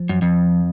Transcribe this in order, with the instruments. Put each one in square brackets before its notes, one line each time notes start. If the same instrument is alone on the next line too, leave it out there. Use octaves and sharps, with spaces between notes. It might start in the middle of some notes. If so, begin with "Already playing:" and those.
Already playing: [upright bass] F3
[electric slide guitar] F#2
F2